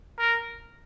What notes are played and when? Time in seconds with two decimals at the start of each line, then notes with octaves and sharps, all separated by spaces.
0.19 A#4